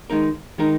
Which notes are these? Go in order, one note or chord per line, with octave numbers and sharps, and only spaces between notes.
D#3 G#3 D#4 A#4
D#3 G#3 D#4 A#4